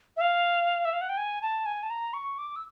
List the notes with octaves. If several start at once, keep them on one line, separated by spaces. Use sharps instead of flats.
E5
F5
E5
F5
F#5
G5
G#5
A5
G#5
A5
A#5
C#6
D6
E6